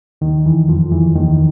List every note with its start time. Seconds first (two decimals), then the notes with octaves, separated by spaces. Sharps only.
0.21 D#2 D#3
0.45 E2 E3
0.68 F2 F3
0.92 E2 E3
1.16 D#2 D#3